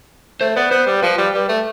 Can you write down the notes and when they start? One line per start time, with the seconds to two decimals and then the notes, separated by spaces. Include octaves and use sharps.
0.41 A3 C5
0.56 B3 D5
0.71 B3 C5
0.87 G3
1.02 F3 B4
1.18 G3
1.34 G3
1.49 A3